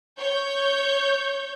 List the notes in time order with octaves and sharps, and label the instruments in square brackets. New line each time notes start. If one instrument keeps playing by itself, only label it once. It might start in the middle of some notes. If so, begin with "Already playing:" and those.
[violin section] C#5 G6